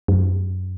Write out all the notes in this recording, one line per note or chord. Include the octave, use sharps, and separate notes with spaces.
F#2